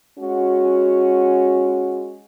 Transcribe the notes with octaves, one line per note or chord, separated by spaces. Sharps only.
G#3 C#4 F#4